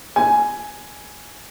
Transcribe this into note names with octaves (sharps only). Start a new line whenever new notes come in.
G#5